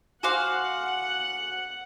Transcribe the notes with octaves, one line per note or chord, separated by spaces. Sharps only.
F#4 C5 F5 F#5 G#5 D6 F#6